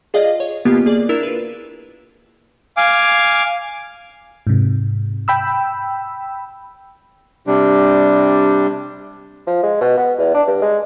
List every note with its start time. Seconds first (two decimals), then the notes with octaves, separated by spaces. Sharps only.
0.14 F4 G#4 D5 D#5 F5
0.40 C#5
0.65 C#3 A#3 B3 F4 G4
0.86 A#3 G#4 D5
1.09 D4 E4 A#4 E6 B6 E7
1.23 F4 B4
2.77 F5 G#5 D6
4.47 G#2 C3
5.28 G5 B5 E6
7.47 C3 G3 D4
9.47 F3
9.63 G#3
9.81 B2
9.98 B3
10.18 E2
10.34 D4
10.48 G2
10.62 G#3